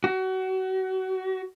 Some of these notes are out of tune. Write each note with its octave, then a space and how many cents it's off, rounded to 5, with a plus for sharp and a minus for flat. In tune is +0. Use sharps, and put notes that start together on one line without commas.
F#4 +30